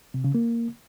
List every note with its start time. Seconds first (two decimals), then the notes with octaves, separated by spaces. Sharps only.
0.14 C3
0.24 C#3
0.35 A#3